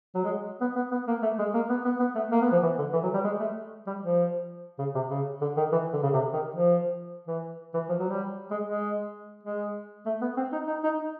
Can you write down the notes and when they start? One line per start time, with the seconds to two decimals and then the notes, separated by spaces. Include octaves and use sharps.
0.15 F#3
0.24 G#3
0.61 B3
0.76 B3
0.91 B3
1.08 A#3
1.23 A3
1.38 G#3
1.54 A#3
1.69 B3
1.85 B3
1.99 B3
2.15 A3
2.31 A#3
2.42 B3
2.52 F3
2.62 E3
2.78 D3
2.93 E3
3.03 F#3
3.14 G3
3.24 G#3
3.40 A3
3.87 G3
4.02 F3
4.79 C#3
4.95 C3
5.10 C#3
5.41 D3
5.57 D#3
5.72 E3
5.93 D3
6.03 C#3
6.13 C3
6.33 D#3
6.55 F3
7.27 E3
7.74 E3
7.89 F3
7.99 F#3
8.09 G3
8.51 G#3
8.66 G#3
9.43 G#3
10.06 A3
10.21 B3
10.37 C4
10.53 D#4
10.67 D#4
10.83 D#4